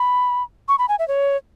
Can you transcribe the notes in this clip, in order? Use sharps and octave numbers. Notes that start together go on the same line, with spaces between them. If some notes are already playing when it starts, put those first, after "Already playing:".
Already playing: B5
C#6
B5
G#5
E5
C#5